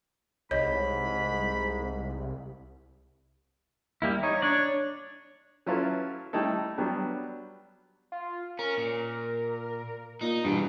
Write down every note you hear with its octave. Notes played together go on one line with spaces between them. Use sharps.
C2 G#2 C#5 D#5 B5
G3 A#3 E4
D#4 C#5
D4 C#5 D5
F#3 C#4 E4 F4 A4 B4
G3 A3 D#4 E4 A4
F#3 G3 B3 D4
F4
C#4 A#4
A#2
A#2 D#4
E2 G2 B2